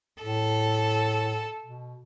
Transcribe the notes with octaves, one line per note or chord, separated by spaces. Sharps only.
A2 A4
B2